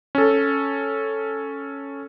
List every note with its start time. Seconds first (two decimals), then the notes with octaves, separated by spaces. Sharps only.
0.15 C#4 A4